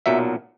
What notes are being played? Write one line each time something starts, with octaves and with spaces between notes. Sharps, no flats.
B1 A#2 F#3 E5